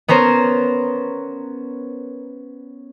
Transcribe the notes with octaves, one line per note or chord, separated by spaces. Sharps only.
B3 C#4 A#4 C5